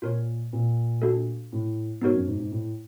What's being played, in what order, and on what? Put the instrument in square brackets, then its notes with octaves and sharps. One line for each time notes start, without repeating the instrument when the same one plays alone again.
[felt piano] A#2 [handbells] F4 A#4 C#5
[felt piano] A#2
[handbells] A3 D4 F#4 A4
[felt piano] A2
[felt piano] G#2 [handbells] B3 D#4 F#4 A#4 C#5
[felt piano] F#2
G#2
G#2
A2